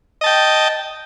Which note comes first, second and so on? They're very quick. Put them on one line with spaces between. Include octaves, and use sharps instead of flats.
D#5 A5 G5